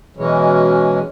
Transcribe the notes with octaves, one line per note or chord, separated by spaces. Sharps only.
B2 E3 F#3 G#3 C#4